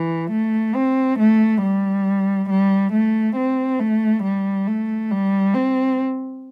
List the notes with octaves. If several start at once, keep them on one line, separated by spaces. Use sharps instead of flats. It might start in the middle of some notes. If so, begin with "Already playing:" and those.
Already playing: E3
A3
C4
A3
G3
G3
A3
C4
A3
G3
A3
G3
C4